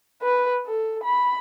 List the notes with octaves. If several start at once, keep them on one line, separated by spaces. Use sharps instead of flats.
B4
A4
B5